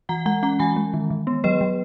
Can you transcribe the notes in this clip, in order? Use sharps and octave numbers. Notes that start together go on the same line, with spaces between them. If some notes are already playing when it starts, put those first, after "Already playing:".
E3 F#5 A#5
G#3 F#5 A#5
C#4 F#5 A#5
E3 G#5 B5
G#3
D#3
D#3
B3
F#3 B4 D#5
F#3